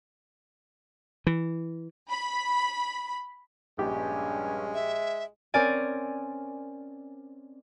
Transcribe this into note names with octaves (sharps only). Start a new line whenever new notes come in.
E3
B5
A#1 G2 G#3 C#4 G4
E5
C4 C#4 A#4 C#5 D5 G#5